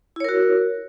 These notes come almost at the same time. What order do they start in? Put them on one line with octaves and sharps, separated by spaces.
E4 C#5 A#4 F#4